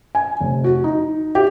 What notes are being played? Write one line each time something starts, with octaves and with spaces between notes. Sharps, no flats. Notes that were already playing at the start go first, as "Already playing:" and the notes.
G#5
F1
F#4
D#4
G4